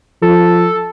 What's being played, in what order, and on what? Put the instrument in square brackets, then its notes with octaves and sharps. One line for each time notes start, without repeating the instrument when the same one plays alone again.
[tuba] F3 [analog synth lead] A4